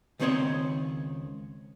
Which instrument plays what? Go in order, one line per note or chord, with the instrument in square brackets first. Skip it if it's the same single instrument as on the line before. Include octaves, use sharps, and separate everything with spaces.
[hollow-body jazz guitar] C#2 D#3 C4 C5 C#5 D#5